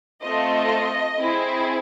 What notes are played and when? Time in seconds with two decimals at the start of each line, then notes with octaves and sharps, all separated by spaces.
0.22 A3 C4 F4 A4 D#5
1.18 C4 E4 G#4